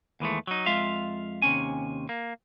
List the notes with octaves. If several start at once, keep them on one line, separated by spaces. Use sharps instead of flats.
D#2 E3 G#3 A3
F#3 D#4
F2 G#3 F4 E5 F5
D#2 C3 C#4 G#5
A#3